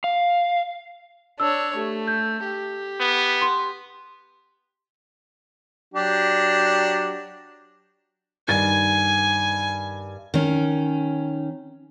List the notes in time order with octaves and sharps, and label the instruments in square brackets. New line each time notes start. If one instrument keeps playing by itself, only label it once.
[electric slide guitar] F5
[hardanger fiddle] D4 C#5 [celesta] E6
[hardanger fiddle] A3 [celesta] G4
[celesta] G6
[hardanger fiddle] G4
[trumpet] B3
[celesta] C6
[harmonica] F#3 D4 G4
[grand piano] G2 D#3 A6 [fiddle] G#5
[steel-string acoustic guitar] D#3 C#4